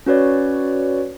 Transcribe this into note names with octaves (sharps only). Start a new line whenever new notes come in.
C#4 F#4 B4 C#5 D5